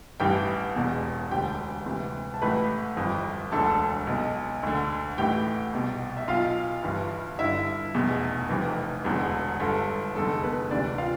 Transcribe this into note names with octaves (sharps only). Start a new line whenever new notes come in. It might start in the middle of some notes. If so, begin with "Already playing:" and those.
A1 G2 E3 G4 G5
E1 E2 B2
E1 D2 D3 G4 G5
D2 C3 E3
A5
A1 A2 E3 B4 B5
G1 F2 E3
E1 D2 D3 A4 A5
B1 B2
D2 D3
A1 A2 E3 G4 G5
C2 B2
E5
B1 B2 F4 F5
G1 G2 E3
G1 G2 D3 E4 E5
F1 E2 B2
F1 F2 E3
E1 E2 D3
G1 G2 D3 A4
F1 E2 D3 A4
B3 B4
D2 C3 E3 D4 D5
F4 F5